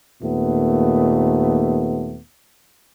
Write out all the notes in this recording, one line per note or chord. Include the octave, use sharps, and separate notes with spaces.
D#2 A#2 A3 B3